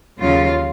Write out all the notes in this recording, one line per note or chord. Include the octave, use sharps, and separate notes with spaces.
D#2 C#3 F#3 F4